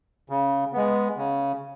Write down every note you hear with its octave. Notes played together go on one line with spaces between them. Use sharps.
C#3
G#3 B3
C#3